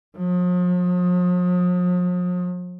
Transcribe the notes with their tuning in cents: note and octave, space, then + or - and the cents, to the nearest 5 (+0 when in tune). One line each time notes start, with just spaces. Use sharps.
F3 +40